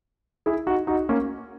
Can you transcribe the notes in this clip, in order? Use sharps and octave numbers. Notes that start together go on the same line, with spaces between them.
E4 G#4
D#4 F#4
D#4 F#4
A#3 C#4